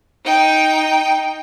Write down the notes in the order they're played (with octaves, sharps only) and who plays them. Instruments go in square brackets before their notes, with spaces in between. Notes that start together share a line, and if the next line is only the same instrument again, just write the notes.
[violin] D#4 G5